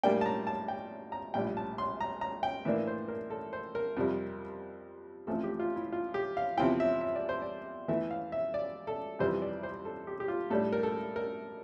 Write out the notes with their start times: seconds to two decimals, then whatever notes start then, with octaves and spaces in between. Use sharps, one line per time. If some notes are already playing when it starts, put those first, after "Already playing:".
0.03 A2 G3 A#3 D4 G5
0.21 A5
0.26 A#5
0.47 A5
0.68 G5
1.12 A#5
1.34 A#1 A2 G3 D4 G5
1.57 A5
1.78 C6
2.00 A#5
2.21 A#5
2.43 G5
2.65 A2 E3 A#3 D4 E5
2.87 C5
3.08 A#4
3.30 A4
3.53 C5
3.75 A#4
3.97 F2 C3 G3
5.27 A1 A2 F3 C4 A4
5.44 G4
5.60 F4
5.76 E4
5.92 F4
6.14 G4
6.37 F5
6.57 E2 C3 F3 C4 E4 G5
6.80 E5
7.01 E5
7.16 D5
7.29 C5
7.42 D5
7.88 E2 E3 A3 E4 E5
8.11 F5
8.32 E5
8.54 D5
8.87 A4
9.19 F2 C3 E3 G3 C5
9.42 D5
9.63 C5
9.85 A4
10.07 G4
10.20 G4
10.28 F4
10.50 A2 G3 D4 A4
10.72 A#4
10.83 A4
11.16 A#4